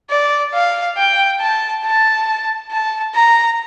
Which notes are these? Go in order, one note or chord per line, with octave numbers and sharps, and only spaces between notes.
D5
F5
G5
A5
A5
A5
A#5